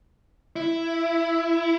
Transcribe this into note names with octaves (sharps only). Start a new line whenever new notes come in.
E4